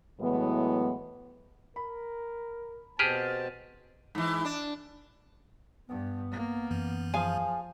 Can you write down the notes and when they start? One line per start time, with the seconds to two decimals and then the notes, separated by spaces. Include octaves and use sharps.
0.20 A2 E3 F#3 G#3 B3
1.76 A#4 B5
2.99 B2 C4 G4 G#4 A5 F6 G6 B6
4.15 G#2 E3
4.45 D4
5.89 G2 B3
6.31 A#3
6.71 F#2 E3
7.14 F3 G#4 F5 G#5